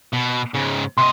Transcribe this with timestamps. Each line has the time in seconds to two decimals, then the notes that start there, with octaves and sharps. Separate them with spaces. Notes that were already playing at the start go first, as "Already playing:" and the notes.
0.13 B2
0.54 G#2 C#3
0.98 C3 D#5 C6